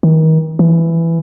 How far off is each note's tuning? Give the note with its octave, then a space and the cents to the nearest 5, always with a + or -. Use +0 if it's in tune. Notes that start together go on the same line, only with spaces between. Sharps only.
D#3 +35
E3 +10